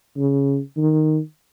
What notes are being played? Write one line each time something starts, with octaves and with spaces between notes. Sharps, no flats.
C#3
D#3